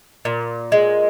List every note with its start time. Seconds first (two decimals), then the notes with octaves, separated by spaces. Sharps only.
0.25 A#2
0.72 G#3